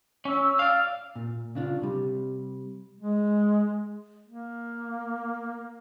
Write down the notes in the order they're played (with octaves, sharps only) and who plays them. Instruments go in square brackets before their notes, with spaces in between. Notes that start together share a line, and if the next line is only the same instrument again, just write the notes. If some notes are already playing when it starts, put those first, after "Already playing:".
[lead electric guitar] C#4 [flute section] E6
[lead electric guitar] D5 F5
[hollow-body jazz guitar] A#2
C#3 D4 F4
C3 G3
[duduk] G#3
A#3